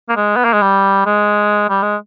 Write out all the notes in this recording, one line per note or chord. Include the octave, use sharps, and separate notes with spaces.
A#3
G#3
B3
A#3
G#3
G3
G#3
G3
G#3